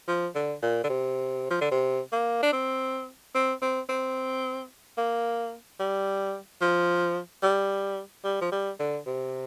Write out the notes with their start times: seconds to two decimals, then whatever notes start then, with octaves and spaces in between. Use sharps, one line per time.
0.08 F3
0.35 D3
0.62 A#2
0.84 D3
0.89 C3
1.51 F3
1.61 D3
1.71 C3
2.12 A#3
2.43 D4
2.53 C4
3.35 C4
3.62 C4
3.89 C4
4.98 A#3
5.80 G3
6.62 F3
7.43 G3
8.24 G3
8.41 F3
8.52 G3
8.79 D3
9.06 C3